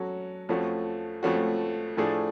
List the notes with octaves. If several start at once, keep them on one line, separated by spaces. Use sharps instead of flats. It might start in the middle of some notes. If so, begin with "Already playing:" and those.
Already playing: F#3 C#4 F#4 A4
F2 F3 A3 C#4 F#4
F2 F3 A3 C#4 F#4
A2 F3 A3 D4 G#4